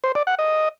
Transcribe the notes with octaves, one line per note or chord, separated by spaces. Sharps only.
C5
D5
F#5
D#5